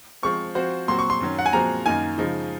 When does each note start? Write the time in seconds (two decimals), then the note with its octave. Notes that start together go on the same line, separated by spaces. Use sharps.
0.23 F3 G#3 C4 C#6
0.55 F3 C4 F#4 C5
0.88 A#2 F#3 C4 F#4 C6
0.99 C#6
1.10 C6
1.20 F#2 D#3 F#3 C#4
1.39 F#5
1.46 G#5
1.53 A#2 F3 G#3 C4 F#4 A#5
1.86 F#2 D#3 A#3 D#4 G#5
2.18 C#3 F3 G#3 D#4